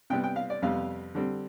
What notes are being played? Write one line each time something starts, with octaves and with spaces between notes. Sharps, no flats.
C3 G3 B3 G5
G5
F5
D5
F2 C3 G3 B3 F5
D3 G3 C4